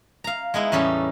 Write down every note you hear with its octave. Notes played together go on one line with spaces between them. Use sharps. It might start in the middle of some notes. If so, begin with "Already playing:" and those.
F5 A#5
G#3 B3 D#4 E4
E2 A2 G3 C#4 D#4 A4